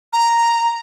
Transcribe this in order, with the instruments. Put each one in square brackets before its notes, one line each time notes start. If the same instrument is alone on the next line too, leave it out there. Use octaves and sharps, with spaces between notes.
[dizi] A#5